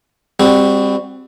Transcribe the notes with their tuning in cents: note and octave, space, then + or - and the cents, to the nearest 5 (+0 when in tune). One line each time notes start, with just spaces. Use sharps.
G3 +25 C4 +0 F#4 +0